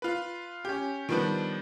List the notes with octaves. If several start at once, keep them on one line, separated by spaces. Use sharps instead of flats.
F4 B4
C#4 G4
D#3 F3 G3 B3 D4